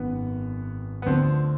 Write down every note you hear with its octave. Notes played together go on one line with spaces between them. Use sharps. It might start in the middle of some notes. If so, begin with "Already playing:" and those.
Already playing: G#1 F#2 D#3 B3
B3
D2 D3 F3 C4